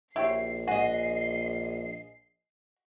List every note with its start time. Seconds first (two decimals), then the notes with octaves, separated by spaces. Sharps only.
0.16 A#1 E4 G4 C#5 C7
0.68 F#4 D#5 G#5